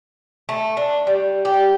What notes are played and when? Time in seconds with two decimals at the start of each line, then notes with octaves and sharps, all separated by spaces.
0.49 A3
0.77 D4
1.07 G3
1.45 G4